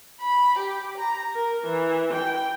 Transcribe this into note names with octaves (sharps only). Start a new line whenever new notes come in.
B5
G4
A#5
A#4
E3
G5